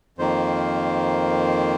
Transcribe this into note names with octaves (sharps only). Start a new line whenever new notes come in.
F2 D#3 A#3 C5